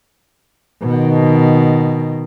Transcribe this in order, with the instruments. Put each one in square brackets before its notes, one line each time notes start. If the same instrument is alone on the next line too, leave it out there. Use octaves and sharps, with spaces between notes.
[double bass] B2 D#3